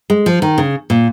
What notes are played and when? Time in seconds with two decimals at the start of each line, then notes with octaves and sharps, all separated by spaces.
0.10 G#3
0.26 F3
0.42 D#3
0.58 C#3
0.90 A#2